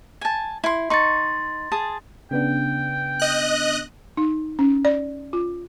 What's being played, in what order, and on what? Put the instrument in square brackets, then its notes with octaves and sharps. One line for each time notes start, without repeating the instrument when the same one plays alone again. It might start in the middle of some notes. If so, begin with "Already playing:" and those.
[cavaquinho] G#5 A5
E4 C6
[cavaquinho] D#4 C#6 [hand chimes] C6 A6
[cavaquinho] G#4 A5 D#6
[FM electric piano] C#3 B3 D4 [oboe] G5
[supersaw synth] D#5 F#6
[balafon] D#4
C#4
D5
F4